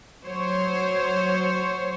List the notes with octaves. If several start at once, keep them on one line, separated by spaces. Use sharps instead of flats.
F#3 C5 C#5